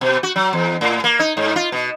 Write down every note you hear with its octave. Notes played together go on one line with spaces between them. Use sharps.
B2
F#4
F#3
E2
A2
A#3
D#4
G#2
F4
B2